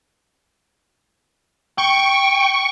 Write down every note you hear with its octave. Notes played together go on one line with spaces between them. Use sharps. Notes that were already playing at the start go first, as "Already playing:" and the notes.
G5 C#6